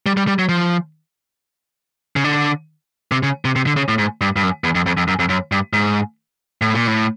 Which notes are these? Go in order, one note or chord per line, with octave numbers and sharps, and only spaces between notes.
G3
G3
G3
F#3
F3
C#3
D3
C3
C#3
C3
C3
D3
C#3
A2
G#2
G2
G2
F#2
E2
F2
F2
F2
F#2
F2
F#2
G2
G#2
A2
A#2
A2